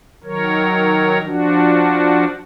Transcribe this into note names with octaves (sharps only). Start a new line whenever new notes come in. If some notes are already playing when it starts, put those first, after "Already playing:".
D#3 F#3 A#4 C#5
F3 D4 F#4